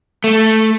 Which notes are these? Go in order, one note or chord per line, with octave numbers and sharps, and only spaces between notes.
A3